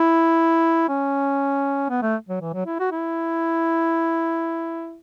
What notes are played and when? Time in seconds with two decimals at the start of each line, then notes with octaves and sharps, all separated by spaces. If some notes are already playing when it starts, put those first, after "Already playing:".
Already playing: E4
0.89 C#4
1.90 B3
2.02 A3
2.29 F#3
2.41 E3
2.54 F#3
2.66 E4
2.79 F#4
2.92 E4